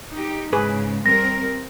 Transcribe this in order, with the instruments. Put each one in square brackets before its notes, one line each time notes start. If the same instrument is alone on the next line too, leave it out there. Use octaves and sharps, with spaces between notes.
[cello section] D#4 G4
[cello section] G#2 C#3 [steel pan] G#4 B4
[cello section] G3 C4 A#4 [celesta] A#6